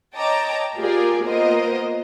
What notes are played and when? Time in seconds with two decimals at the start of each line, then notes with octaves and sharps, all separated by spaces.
0.15 C#5 D#5 G5 A5 A#5 D6
0.78 A#3 F4 G4 G#4 A#4 D5
1.24 A#3 B3 F4 A#4 C5 D#5